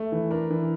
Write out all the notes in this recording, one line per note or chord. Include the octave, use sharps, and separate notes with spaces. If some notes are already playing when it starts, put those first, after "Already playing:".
Already playing: A3
E3
D4 A#4
E3